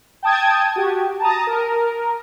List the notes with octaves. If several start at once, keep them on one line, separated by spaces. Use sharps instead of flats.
G5 A5 D#6 G#6
F#4 G4
A5 A#5 D#6
A#4